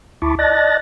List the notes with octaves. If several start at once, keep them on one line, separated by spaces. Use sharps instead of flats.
D2 E4 A5 B5 C#6 D6
D5 D#5 A5 F#6 A6 A#6